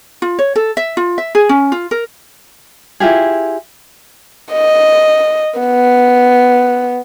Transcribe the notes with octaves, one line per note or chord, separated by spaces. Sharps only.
F4
C#5
A4
E5
F4
E5
G#4
C#4
F4
A#4
E4 F4 G4 G#4
D#5
B3